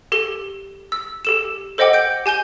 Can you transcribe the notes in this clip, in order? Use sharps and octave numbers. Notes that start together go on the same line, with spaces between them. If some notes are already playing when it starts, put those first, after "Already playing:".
G4 A4 G7
E6
G4 A4 E7
A4 C5 D#5 F#5 G5 D6
G6 D7
G4 G#5 G6 G7